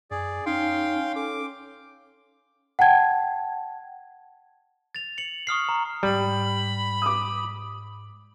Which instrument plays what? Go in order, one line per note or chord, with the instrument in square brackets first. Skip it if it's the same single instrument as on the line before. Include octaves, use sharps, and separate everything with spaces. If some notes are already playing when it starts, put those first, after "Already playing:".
[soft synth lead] F#2 [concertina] G#4 D5
[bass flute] C#4 [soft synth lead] D#4 [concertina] F5 G5 C6
[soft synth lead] A4 [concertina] D6
[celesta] F#5 G5 A5 G#6
[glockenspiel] A6 F7
C#7 F#7
C#6 D#6 F6 C7
A#5
[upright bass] G#2 [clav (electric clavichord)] G3 [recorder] B5
[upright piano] D6 D#6